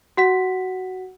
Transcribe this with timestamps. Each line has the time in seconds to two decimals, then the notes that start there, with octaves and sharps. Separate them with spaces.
0.17 F#4 F#5 B6